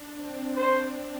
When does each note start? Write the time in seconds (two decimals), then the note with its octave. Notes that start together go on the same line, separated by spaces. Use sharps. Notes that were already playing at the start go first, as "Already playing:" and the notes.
Already playing: D4
0.16 C4
0.56 C5